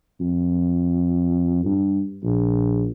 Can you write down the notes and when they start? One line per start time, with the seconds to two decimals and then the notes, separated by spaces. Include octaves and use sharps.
0.20 F2
1.65 G2
2.23 A#1